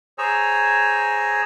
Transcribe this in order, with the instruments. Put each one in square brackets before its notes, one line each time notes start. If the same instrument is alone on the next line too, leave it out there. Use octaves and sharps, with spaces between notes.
[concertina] G#4 C5 C#5 G#5 A#5 E6